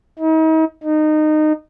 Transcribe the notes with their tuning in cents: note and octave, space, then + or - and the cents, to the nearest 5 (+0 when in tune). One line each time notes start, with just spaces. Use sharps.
D#4 +40
D#4 -20